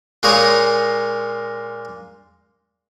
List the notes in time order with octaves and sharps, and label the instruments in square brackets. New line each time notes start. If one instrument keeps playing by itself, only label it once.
[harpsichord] A#2 G#3 A#3 C#5 A#5 D#6